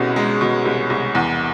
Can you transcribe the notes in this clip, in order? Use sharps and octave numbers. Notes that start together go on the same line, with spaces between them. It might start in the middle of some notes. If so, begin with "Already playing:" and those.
Already playing: C2 B2 G#3 C#4
G#3
B2
C2
C2
E2